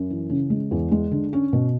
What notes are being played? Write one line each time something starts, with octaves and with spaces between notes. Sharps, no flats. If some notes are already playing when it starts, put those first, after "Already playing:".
Already playing: F#2
E3
C#3
G#3
E2
G#3
D3
C#4
B2